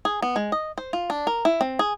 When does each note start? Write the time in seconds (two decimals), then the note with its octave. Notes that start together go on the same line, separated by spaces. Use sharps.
0.05 G#4
0.22 B3
0.36 G#3
0.52 D#5
0.78 C5
0.93 F4
1.10 D4
1.27 A#4
1.45 E4
1.61 C4
1.79 G#4